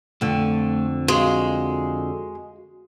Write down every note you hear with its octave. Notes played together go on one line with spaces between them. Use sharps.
F2 D3 A3
G#3 F#4 F5